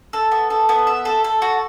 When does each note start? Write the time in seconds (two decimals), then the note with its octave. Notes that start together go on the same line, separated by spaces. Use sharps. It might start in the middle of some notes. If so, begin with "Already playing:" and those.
0.13 A4
0.31 B3
0.50 A4
0.69 B3
0.87 E5
1.05 A4
1.24 A4
1.42 F#4